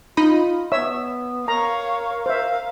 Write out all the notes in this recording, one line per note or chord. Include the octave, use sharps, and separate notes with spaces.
D#4 F4 D#5 B5
B3 C#5 E5 E6
A#4 C#5 F5 A#5
C5 E5 F5